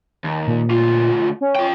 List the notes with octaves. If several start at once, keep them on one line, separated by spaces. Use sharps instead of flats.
D#2
A#2
D2 F4
C#4
F4 G5